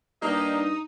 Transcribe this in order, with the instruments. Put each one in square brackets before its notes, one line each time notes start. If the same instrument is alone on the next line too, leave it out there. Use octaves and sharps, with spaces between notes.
[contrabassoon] G2 [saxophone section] A#3 D4 G4 [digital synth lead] D#4 [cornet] D#5